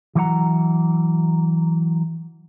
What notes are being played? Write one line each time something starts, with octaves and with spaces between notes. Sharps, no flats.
E3 F#3 A#4 C5 F#5 A#5